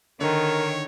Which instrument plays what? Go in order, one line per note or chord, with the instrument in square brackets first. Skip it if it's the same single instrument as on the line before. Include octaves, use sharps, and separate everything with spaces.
[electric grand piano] D3 D#4 [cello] D#3 [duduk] A#4 [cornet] C#5